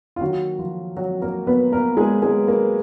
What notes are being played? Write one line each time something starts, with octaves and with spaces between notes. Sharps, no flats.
F4
D#3 F#3 A#3 F#4
F3 F4
F#3 F#4
A#3 A#4
B3 B4
A#3 A#4
G#3 G#4
G#3 G#4
A#3 A#4